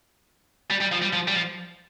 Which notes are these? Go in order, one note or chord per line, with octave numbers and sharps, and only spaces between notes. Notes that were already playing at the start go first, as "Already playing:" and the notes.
G3
G3
F3
G3
F3
G3
F3